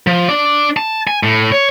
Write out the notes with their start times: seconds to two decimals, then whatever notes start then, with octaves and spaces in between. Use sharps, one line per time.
0.07 F3
0.29 D4 D5
0.77 A5
1.07 G#5
1.23 A2
1.52 C#5